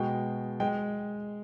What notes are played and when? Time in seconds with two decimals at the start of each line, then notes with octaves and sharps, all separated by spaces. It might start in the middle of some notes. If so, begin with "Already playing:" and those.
Already playing: B2 G#3 G5
0.60 G#3 G5